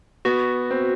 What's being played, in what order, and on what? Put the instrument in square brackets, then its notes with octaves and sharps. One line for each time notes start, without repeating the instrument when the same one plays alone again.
[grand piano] B3 [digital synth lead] F#4
[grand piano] C4